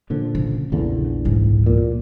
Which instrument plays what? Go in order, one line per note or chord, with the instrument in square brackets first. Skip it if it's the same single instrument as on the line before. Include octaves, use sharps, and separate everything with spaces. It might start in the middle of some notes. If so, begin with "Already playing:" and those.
[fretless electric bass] A#2 D3 F3
[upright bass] C#3
[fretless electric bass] A#1 E2 D3
[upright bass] C#2 G#2
[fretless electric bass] A#2